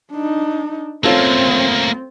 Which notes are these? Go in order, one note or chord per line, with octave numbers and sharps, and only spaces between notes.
D4 D#4
A3 A#3 C4 C#4 F4 A4